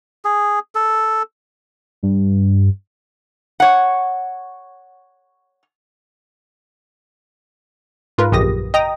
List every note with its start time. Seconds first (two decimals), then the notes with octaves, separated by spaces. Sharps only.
0.25 G#4
0.75 A4
2.03 G2
3.60 C#5 F#5
8.18 G#2 F4 A#4 B4
8.32 A#1 F#2 C#3 G4 D#6 A#6
8.74 D#5 G5 A#5 D#6 A#6